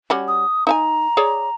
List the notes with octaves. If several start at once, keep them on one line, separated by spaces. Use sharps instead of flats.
G3 C#4 F#4
D#6
D#4 E5 G#5 A#5
G#4 C#5 D5